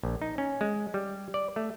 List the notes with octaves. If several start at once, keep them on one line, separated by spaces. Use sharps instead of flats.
A#1
D#4
C#4
G#3
G3
D5
A3